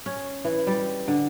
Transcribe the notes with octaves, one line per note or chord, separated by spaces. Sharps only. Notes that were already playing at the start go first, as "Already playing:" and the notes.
C#4
E3
G3
D3